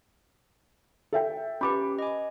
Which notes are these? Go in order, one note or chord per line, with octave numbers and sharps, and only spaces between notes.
A4 E5 G5
C#4 G4 B4 B5 D6
D#5 G#5